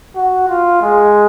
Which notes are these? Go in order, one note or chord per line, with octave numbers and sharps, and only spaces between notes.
F#4
F4
G#3